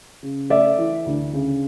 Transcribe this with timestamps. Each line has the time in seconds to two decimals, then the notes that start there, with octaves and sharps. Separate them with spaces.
0.23 C#3
0.50 A3 D5 E5
0.78 E3
1.06 D2
1.33 C#3